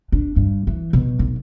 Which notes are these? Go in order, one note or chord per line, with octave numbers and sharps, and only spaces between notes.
D4
G2
E3
B2
B1